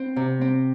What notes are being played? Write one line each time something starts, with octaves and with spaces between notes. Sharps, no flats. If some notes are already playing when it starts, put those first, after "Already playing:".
Already playing: C4
C3
C4